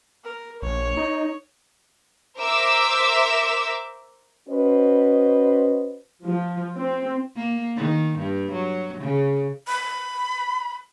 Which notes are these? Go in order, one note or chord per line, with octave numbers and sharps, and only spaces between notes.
A#4
A#1 C#5
D#4
A#4 C5 E5 D6 E6
C#4 F#4 B4 C5 D#5
F3
C4
A#3
D#3
G2
F#3
C#3
B5